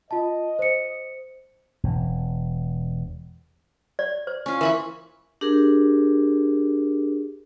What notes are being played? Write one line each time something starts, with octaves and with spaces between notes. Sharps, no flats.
F4 D#5 A5
C5 C#7
E1
D5
C5
C#4 F4
E3 A#4 B5 C#6
D4 G4 G#4 A#4